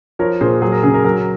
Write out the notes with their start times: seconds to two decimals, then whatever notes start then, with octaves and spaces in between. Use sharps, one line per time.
0.19 F3 A#4 C#5
0.41 A#2 G#4 C5
0.62 F#3 G#4
0.72 A#4
0.83 C#3 G#4
0.94 A#4
1.04 F#3 A#4